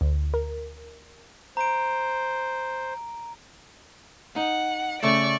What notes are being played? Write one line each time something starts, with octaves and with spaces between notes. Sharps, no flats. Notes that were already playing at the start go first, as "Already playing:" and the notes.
D2
A#4
C5 A#5 D7
D#4 F#5
C#3 A3 D5 C#6